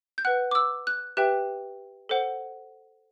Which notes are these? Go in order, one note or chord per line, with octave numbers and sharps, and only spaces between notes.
G6
B4 F#5 F#6
D6
E6
F#6
G4 B4 E5 G5 F#6
A4 C5 F#5